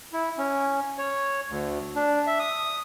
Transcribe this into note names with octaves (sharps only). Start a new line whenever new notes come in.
E4
C#4
C#5
D2
D4
E5
D#6